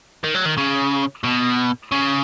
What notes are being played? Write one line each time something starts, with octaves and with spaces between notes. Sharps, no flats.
D#3
F#3
D#3
C#3
B2
C#3